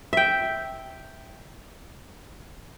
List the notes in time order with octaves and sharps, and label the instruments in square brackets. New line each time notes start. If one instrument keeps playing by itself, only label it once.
[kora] E5 G5